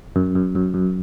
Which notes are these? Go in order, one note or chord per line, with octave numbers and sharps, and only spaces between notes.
F#2
F#2
F#2
F#2